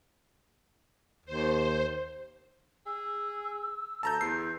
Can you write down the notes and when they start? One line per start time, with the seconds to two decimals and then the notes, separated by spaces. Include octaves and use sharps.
1.26 D#2 C5
2.86 G#4 E6
4.03 D2 A5 A#5 G6
4.21 E2 C7